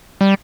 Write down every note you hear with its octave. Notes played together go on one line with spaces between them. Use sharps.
G3